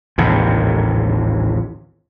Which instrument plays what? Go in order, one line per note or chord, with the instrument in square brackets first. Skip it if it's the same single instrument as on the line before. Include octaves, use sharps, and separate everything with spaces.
[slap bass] A1 D#2 G#2 C3